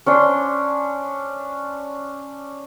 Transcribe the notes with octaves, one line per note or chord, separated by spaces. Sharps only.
C#4 D4 C6